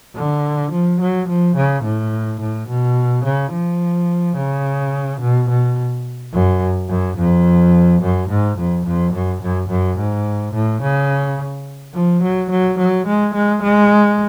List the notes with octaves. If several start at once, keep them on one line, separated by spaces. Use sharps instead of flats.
D3
F3
F#3
F3
C#3
A2
A2
B2
C#3
F3
C#3
B2
B2
F#2
F#2
F2
F#2
G#2
F2
F2
F#2
F#2
F#2
G#2
A2
C#3
F3
F#3
F#3
F#3
G#3
G#3
G#3